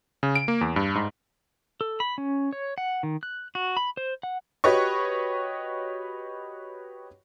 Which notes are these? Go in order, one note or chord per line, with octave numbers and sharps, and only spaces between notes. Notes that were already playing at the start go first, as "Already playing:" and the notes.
C#3
D7
A#3
E2
G2
G#2
A4
B5
C#4
C#5
F#5
D#3
F#6
F#4
B5
C5
F#5
F#4 G4 B4 C#5 D#5 C#6